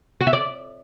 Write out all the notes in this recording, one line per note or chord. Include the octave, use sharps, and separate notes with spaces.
F#4
E5
D5